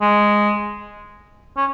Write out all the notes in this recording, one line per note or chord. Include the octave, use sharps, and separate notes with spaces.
G#3
C#4